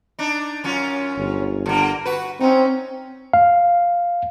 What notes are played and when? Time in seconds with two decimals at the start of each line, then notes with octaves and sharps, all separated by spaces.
0.19 D4 D#4
0.64 F#2 C#4 F4
1.17 G1
1.66 D3 A#3
2.05 F#4 B4
2.41 C4 C#4 D#4
3.33 F5